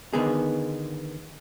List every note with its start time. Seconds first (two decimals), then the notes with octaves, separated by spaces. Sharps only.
0.13 D3 D#3 B3 G#4